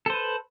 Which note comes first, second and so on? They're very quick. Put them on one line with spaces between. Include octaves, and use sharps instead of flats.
A4 C5 B4